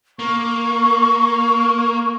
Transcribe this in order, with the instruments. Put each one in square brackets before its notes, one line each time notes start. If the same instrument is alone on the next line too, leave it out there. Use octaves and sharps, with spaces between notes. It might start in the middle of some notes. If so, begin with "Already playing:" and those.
[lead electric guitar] A#3 [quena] C#6